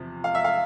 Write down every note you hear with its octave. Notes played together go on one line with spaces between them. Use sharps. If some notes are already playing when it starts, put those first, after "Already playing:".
Already playing: E2 C3 F3
F5
E5
F5